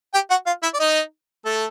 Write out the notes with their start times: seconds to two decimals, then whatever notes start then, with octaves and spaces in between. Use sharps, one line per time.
0.14 G4 G5
0.30 F#4 F#5
0.47 F4 F5
0.63 E4 E5
0.74 D5
0.80 D#4 D#5
1.46 A3 A4